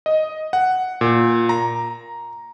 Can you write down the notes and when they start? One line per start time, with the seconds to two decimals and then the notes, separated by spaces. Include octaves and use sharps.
0.06 D#5
0.53 F#5
1.01 A#2
1.49 A#5